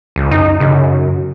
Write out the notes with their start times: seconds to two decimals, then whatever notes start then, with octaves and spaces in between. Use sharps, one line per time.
0.16 C#2
0.31 F#2 D#4
0.60 F#2 C#3